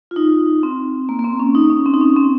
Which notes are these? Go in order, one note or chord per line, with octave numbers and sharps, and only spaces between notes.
F4
D#4
C4
A#3
A#3
C4
C#4
D#4
C#4
C4
D#4
C#4
C4